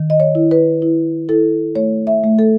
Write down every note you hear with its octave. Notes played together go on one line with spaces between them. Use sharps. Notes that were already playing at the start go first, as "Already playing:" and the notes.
Already playing: D#3
D#5
C#5
E4
B4
E4
E4 A4
A3 C#5
E5
A3
A4